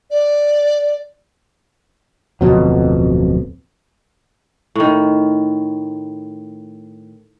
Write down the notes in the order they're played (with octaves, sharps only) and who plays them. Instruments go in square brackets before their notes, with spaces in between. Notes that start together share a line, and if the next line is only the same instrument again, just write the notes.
[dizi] D5
[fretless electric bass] D1 F2 B2 F#3
[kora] A2 D#3